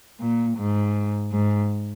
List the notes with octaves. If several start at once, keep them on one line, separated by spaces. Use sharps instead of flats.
A#2
G#2
G#2